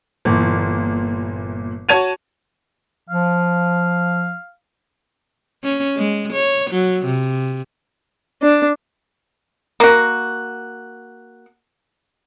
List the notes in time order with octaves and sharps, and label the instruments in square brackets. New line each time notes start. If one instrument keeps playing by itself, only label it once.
[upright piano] G1 A#2 E3
F#4 C#5 A5 G#6 D#7 F7
[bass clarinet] F3 [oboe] F5
[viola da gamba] C#4
G#3
C#5
F#3
C3
[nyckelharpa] D4
[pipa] A#3 F#4